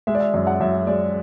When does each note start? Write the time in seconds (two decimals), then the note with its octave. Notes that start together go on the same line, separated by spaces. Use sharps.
0.07 G#3 E5
0.15 D5
0.20 E5
0.34 F#2 E5
0.47 F#5
0.60 F#2 E5
0.87 G#3 D5